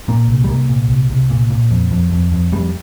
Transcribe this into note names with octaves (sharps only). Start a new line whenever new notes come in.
A#2 A#3
C2
G3
C2 A#3
A#2
C2
C2
A#2
A#2
F2
F2
F2
F2
F2 G3